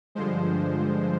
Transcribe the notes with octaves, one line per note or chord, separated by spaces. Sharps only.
G2 D3 F3 G#3 C5